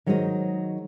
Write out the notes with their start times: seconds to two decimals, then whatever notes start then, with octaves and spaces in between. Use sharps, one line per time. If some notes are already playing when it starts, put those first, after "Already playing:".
0.06 D#3 F#3 G#3 G#4 C5 D#5